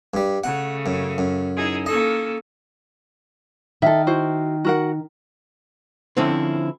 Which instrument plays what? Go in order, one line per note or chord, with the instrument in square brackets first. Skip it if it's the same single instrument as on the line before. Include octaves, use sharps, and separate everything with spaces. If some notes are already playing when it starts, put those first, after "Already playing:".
[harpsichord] G2 G3
[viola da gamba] C#3 A3 [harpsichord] F#5
[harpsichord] F#2
F#2
[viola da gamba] D#4 E4 G#4
[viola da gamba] A#3 C#4 A4 [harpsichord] D#5
[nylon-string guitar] D#3 [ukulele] A4 E5
[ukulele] E4 F#4 C5
F#4 A#4 F#5
[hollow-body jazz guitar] D3 F3 C4 C#4 E4